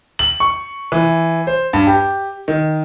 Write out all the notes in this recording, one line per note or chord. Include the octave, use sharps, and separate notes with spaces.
F#7
C#6
E3
C5
G2
G4
D#3